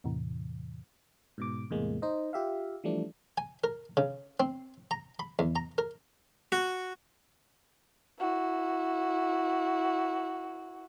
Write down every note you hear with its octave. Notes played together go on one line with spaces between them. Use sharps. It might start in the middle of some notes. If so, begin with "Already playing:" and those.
E2 A2 C3 E3
G#2 B2 D6
E2 A2 C3 G#3 A#3
D#4 C5 D#5
F4 G4 E5 F5
E3 F3 G3 A3 D4
G#5
A#4
C#3
C4
A#5
B5
E2
A#5
A#4
F#4
E4 F#4